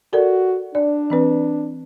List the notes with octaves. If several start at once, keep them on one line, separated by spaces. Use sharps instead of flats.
F#4 A4 A#4 D5
D4 D5
E3 C4 B4